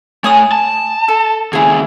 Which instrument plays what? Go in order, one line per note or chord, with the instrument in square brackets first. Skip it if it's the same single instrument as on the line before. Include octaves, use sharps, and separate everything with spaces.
[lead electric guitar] A3 C#5 [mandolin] G#5 D#6 F#6
[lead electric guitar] A5
[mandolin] A4
[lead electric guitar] D#2 C#3 [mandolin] E4 G#4